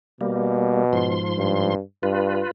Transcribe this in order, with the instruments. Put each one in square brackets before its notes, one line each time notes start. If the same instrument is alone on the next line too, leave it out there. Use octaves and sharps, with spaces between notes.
[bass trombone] B2 [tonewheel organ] G3 A#3
[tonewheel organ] G#2 F3 C6
[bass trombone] G2
[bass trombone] G2 [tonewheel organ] F4 B4